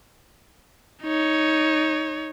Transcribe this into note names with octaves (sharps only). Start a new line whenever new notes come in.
D#4 C#5